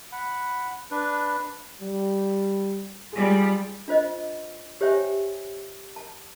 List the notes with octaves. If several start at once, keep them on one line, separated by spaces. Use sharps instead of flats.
F#5 B5
D4 B4
G3
G3 F4 G#4
D4 F4 C5 D#5
G4 C5 C#5 E5 G5 G#5
A5